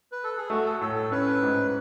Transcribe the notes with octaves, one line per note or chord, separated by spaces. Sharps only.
B4
A4
G#4
A3 F#4
A4
A2 A4
A4
C#4 B4
G#2